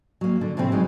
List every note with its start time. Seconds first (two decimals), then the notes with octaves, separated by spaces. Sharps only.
0.21 F#3 A#3
0.41 D3
0.57 A2 C3 F3 A3 C4
0.72 F#3 G#3 D#4